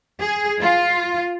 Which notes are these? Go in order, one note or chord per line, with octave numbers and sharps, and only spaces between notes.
G#4
F4